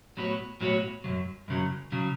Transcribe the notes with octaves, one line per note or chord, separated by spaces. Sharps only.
A2 F#3 B3 F#4 C#5
A2 F#3 B3 F#4 C#5
F#2 C#3 F#3
F#2 C#3 F#3
C#3 F#3